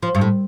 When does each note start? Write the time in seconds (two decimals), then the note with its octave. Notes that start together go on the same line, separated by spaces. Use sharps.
0.03 F3
0.15 G2
0.21 A2